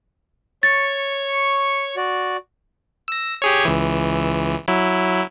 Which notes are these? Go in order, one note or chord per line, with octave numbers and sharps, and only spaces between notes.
C#5 C#6 A6
F#4 D5
E6 A#6
G4 G#4 C#5
C#2 E3
F#3 E4